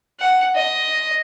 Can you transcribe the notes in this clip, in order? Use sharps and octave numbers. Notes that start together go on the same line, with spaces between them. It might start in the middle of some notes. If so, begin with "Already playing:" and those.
F#5
D#5